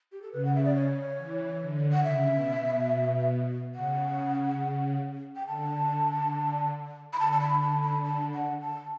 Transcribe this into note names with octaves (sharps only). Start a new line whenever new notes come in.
G4
A4
C#3 B4
F#5
E5
D5
C#5
E3
D3
F#5
C#3 E5
B2
B2
C#3 F#5
G5
D3 A5
B5
D3 A5
A5
B5
A5
B5
A5
F#5
A5